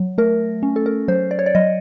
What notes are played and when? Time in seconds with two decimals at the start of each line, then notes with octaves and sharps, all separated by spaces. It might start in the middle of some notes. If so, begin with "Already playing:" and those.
Already playing: F#3
0.18 A3 A#4
0.63 C#4
0.76 A4
0.86 A#4
1.08 F#3 C5
1.31 D5
1.39 C#5
1.46 D5
1.55 F#3 D#5